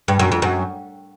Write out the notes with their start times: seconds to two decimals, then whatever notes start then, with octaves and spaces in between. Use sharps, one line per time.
0.08 G2
0.19 F#2
0.32 F2
0.42 F#2